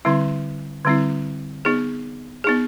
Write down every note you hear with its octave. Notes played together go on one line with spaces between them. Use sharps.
D3 G3 C4 E4
D3 G3 C4 E4
B3 D#4 G#4
B3 D#4 G#4